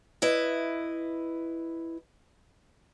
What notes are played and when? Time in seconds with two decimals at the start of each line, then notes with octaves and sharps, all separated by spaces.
0.22 E4 B4 D#5